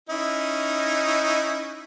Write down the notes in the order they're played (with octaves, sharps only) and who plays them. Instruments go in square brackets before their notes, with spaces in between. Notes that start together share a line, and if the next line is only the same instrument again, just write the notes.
[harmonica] C#4 D#4 E4